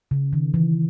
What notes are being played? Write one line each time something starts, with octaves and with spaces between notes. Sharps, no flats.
C#3
D#3
E3